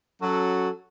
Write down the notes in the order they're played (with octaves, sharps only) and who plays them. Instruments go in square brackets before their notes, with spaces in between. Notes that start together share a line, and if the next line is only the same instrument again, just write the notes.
[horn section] F#3 C#4 F#4 A4